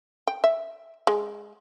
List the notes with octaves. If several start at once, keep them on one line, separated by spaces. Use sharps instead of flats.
G5
E5
G#3